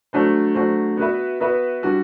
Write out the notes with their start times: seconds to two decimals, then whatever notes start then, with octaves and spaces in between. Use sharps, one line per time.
0.13 F#3 A3 D4 F#4 C5
0.54 F#3 A3 D4 F#4 C5
0.97 B3 F#4 B4 E5
1.40 B3 F#4 B4 E5
1.83 G3 D4 F#4